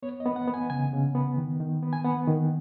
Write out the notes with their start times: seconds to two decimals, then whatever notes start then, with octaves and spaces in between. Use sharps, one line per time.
0.03 B3 C#5
0.20 D#5
0.26 B3
0.36 F#5
0.47 B3
0.54 G#5
0.70 C#3 G#5
0.93 C#3
1.15 B3
1.38 D#3
1.60 D#3
1.83 B3
1.93 G#5
2.04 B3 F#5
2.28 D#3